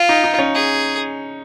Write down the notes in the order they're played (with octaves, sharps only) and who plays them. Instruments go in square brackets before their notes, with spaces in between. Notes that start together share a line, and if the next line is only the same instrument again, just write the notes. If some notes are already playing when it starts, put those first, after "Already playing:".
Already playing: [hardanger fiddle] F4
[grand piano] D#4
D#4
C#4
[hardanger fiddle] G#4